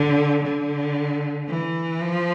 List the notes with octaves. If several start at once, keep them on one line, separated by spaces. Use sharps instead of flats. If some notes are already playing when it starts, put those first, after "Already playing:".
Already playing: D3
D3
E3
F3